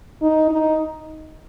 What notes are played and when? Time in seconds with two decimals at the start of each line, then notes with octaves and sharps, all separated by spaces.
0.22 D#4
0.51 D#4